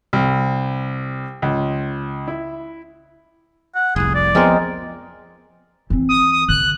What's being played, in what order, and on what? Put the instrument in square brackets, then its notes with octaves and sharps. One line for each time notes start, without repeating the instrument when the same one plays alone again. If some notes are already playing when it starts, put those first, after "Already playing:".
[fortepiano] C2
C#2
E4
[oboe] F#5
[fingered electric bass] F1 C2 [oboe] G#4
[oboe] D5
[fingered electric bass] F3 B3 [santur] G#3 C4 A#4
[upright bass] E3 C4
[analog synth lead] D#6
D#6
[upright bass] D3 [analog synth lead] F#6